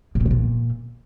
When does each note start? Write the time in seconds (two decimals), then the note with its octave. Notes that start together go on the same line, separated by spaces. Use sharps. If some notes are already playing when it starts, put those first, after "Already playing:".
0.15 A2
0.20 A#2
0.26 D#3
0.31 A#2